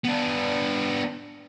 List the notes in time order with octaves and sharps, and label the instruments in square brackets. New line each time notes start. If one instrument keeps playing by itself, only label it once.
[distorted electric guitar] B3 D4